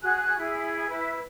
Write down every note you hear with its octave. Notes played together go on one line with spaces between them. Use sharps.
F#4 G#4 G#5 F#6
E4 G#4
E4 B4